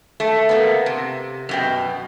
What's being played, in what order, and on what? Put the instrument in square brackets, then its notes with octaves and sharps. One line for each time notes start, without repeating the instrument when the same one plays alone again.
[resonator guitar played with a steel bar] A3
A#3 B3
C3
F#2 B2 G5